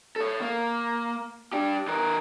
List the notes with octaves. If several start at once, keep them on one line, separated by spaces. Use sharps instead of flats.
A4 C#5
A#3
D4 G4
E3 A#4